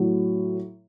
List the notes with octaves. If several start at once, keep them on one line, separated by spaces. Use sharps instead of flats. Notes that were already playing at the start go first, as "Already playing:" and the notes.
Already playing: A2 F#3